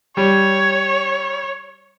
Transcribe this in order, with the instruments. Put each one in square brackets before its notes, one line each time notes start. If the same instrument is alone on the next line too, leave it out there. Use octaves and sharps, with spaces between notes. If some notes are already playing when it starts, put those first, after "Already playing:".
[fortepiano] G3 [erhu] C#5